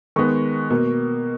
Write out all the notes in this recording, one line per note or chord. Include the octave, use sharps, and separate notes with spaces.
D#3 G#3 B3 C#6
B2 A#3